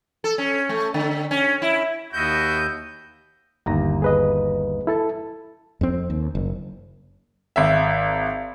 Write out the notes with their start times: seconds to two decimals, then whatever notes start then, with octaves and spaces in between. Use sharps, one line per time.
0.24 A4
0.38 C#4
0.69 A3
0.94 D3
1.31 C#4
1.62 E4
2.13 D#2 E4 F#4 D#5 G6
3.66 G1 D#2 A#5
4.02 G#4 B4 D#5
4.87 E4 A4 A5
5.81 F2 C4
6.10 D#2
6.35 F#1
7.56 G#1 E5